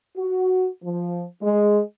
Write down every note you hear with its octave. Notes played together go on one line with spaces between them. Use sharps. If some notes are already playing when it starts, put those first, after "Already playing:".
F#4
F3
G#3